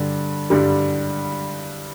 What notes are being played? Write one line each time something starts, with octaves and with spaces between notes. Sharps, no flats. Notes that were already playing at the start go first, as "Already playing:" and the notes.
Already playing: G2 D3 G3
G2 D3 G3